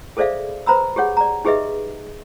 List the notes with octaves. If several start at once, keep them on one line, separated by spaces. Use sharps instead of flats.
G#4 A4 C5 D5 E5 F5
B4 C5 A#5 B5 E6
G4 G#4 C#5 F#5
D5 A#5
D#4 G4 G#4 B4 D#5 E5